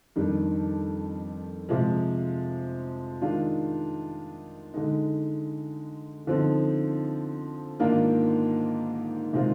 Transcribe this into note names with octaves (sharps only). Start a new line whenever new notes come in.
F2 D#3 G3 D4
C3 F3 G#3
D#3 G#3 D4 F4
D3 G#3 D#4
D3 F3 C4 D#4
G#2 D#3 A#3 D4 F4
C3 D#3 G#3 C4 F4